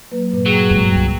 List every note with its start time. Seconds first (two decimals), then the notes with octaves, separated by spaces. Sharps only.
0.12 F#3 A#3 B4
0.32 G2 A#2 B4
0.46 F#3 G#4 G5
0.71 G2 G#3
0.91 C2 G2 G5